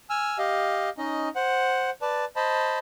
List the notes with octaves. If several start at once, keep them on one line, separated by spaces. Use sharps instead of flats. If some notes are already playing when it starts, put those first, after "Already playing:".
G#5 E6 F6
G4 D#5 F5
C#4 D#4 D#5
C5 F#5
B4 D5 A5
C5 D#5 A5 B5